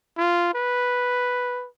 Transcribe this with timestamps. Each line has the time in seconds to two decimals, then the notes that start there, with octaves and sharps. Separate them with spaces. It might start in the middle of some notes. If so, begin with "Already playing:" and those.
0.17 F4
0.54 B4